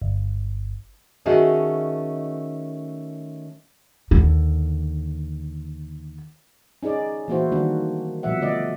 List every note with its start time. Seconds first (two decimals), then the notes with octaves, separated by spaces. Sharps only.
0.02 G1
1.26 D#3 A3 C#4 F#4 G#4 D#5
4.11 D#2 D3
6.83 C#4 D#4 G#4 D5
7.28 E3 A3 A#3 E4 F#4 C5
7.52 D#3 G3 A#3 D4 F#4
8.23 B2 F3 G3 E5 F#5
8.41 D3 A3 D5 D#5